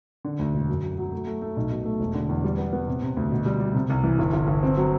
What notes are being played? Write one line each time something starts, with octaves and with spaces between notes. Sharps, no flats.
D3
D2
E1
F#2
F#3
F#3
A3
A3
A3
B1
B2
A3
E1
D3
E2
G3
B3
B3
C3
C3
D2
B2
G3
G3
C3
C2
E3
G1
G1
G1
C4
F#3